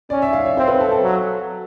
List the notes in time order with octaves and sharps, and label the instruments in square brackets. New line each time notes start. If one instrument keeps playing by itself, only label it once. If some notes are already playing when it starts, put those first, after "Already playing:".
[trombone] C#4 [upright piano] D5
[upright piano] E5
F5
C#5
[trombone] C4 [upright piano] C5
[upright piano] B4
A4
A4
[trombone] F#3